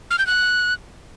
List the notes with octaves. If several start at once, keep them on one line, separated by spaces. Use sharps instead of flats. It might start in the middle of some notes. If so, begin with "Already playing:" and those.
F6
G6
F#6